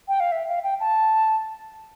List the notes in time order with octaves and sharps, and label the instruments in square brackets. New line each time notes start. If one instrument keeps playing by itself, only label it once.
[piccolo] G5
F5
E5
F5
G5
A5